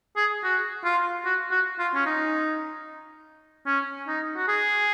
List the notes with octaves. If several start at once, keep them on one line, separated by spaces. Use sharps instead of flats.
G#4
F#4
F4
F#4
F#4
F4
C#4
D#4
C#4
D#4
F#4
G#4